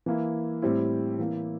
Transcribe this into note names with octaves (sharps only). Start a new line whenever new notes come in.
E3 A#3 E4
A2 G3 C4 E4
E3 A#3 E4